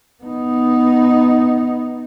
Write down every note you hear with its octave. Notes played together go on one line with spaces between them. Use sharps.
B3 D#4